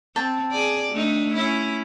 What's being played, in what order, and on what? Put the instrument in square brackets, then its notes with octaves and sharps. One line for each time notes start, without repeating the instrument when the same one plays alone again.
[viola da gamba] C4 [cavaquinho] G5 A5
[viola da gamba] G#4 D5
A3 D4 D#4
C#4 E4